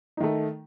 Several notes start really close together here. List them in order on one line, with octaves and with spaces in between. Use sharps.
D#4 D#3 A3